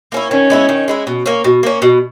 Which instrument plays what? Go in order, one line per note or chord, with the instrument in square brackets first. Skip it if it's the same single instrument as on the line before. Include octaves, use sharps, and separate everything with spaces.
[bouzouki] A#3 C#4 E4
[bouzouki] D#3 [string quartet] C#4
[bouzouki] G#3 B3 E4
D#3
G#3 B3 E4
B2
A#3 C#4
B2
A#3 C#4
B2